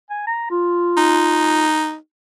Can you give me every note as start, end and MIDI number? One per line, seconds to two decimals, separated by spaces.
0.10 0.26 80
0.27 0.50 82
0.51 1.64 65
0.97 1.95 63